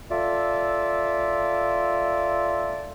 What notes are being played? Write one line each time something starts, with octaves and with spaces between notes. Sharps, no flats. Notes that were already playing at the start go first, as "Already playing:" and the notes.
F4 A4 D5 E5